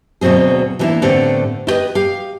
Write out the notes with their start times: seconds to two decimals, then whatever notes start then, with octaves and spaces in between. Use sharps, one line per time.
0.21 D2 B2 F#3 C4 G#4
0.79 E3 G3 A#3 B3 D4 E4
1.02 A2 D3 A3 B3 C4 G4
1.67 E4 G4 B4 D#5
1.95 G4 F5